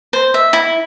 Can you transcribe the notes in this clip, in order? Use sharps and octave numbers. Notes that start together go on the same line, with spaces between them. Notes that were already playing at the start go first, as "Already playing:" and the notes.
C5
E5
E4